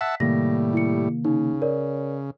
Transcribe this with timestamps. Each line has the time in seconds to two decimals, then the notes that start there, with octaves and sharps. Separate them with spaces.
0.01 E5 F#5 A5 B6
0.20 A2 C3 D#3 G3 A#3 A#6
0.73 E4 G4 C#7
1.25 C#3 D#4
1.62 A#4 C#5 D5